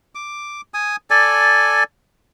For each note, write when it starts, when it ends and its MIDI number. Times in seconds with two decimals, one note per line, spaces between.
0.15 0.61 86
0.74 0.96 80
0.74 0.96 87
1.10 1.84 69
1.10 1.84 74
1.10 1.84 80